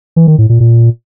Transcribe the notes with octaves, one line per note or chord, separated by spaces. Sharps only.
E3
D#3
A2
A#2
A#2